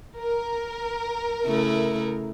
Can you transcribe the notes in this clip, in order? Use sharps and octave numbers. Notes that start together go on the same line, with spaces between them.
A#4
C#3 A3 E4